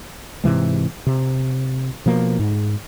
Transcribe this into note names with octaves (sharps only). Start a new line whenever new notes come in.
G#2 C3 E3 G#3
C3
B2 F3 A#3
G#2